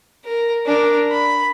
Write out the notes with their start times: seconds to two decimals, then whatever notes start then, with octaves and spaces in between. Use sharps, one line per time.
0.25 A#4
0.66 D4 A#4
1.11 B5